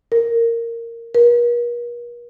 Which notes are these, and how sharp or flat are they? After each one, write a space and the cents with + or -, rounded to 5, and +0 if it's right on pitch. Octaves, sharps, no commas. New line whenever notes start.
A#4 -10
A#4 +45